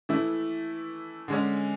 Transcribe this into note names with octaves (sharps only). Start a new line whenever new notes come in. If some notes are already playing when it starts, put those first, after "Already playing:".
E3 A3 E4
D3 G#3 C#4